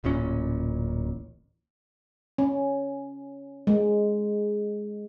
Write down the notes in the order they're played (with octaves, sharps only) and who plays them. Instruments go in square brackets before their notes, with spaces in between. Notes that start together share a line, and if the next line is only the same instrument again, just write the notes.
[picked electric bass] D1 A1 A#2 C#4
[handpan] C#4
G#3